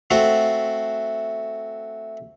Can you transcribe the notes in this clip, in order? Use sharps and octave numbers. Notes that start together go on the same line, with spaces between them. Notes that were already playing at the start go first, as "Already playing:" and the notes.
A3 C4 F#4